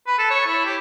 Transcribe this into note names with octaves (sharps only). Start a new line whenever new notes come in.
B4
A4
C#5
E4
G4